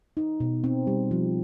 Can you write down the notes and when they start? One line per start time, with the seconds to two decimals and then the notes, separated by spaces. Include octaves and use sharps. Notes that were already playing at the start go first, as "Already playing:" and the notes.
0.17 D#4
0.40 B2
0.64 C4
0.87 G3
1.11 F3